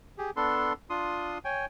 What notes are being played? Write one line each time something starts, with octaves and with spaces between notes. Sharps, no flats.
G4 G#4
B3 D4 A4 C6
D4 F4 C6 D#6
C#5 G5 G#5